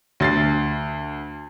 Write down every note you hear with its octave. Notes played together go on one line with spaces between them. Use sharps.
D2 A6 C7